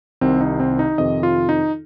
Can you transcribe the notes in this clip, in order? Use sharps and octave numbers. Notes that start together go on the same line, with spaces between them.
C2 C3 D#3 C4
D#4
C4
D#4
F2 C3 D#3 D#5
F4
D#4